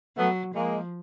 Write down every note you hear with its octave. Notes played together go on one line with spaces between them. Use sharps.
F#3 A3 B3
F3 G#3 A#3